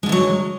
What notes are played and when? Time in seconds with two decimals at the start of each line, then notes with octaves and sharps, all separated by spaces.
0.03 G#3
0.06 D3
0.09 E3
0.12 F#3